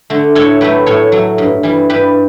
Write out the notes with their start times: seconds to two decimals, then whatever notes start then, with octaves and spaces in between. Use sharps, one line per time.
0.10 D3 A3
0.35 A2 A4 C#5
0.61 F#3 A3 G4 B4
0.86 A2 A4 C#5
1.12 F#3 A3
1.38 G2
1.63 E3 G3
1.90 G2 G4 B4